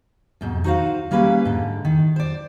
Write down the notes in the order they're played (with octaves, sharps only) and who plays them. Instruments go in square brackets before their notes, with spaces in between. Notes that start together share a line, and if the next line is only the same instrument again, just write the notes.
[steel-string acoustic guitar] F2 G#2 B2
D#4 F#4 C5 F5
G3 A#3 C#4 B4 F5
G#2 D3
D#3
C5 D5